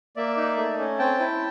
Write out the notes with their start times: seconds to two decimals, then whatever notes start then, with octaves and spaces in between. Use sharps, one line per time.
0.16 A#3 D5 E5
0.37 D#4
0.57 A3
0.79 C#4
0.99 C4 G5 A5
1.20 E4